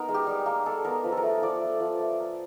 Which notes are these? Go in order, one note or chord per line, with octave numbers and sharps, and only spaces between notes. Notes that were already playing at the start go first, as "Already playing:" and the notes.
Already playing: B3 D#4 A#4
G#3
G4
G3
A#3
G#3 A4
B3 A#4
F3 B4
A4
A#4
A3
A4
F3 D5
A3
F3
A3
A#3